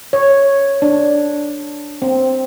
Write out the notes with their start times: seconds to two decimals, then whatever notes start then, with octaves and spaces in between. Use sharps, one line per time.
0.13 C#5
0.82 D4
2.02 C4